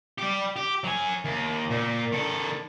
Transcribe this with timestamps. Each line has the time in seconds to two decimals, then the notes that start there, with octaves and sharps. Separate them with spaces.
0.18 G3 G4
0.56 G4
0.84 F#3 G#5
1.25 D#2
1.70 A#2
2.12 D#3 A4